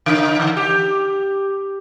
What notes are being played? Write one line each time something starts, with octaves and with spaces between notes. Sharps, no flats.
C#3 D#4
D3
G4